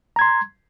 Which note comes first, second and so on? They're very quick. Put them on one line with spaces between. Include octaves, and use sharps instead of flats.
A#5 G#6 C6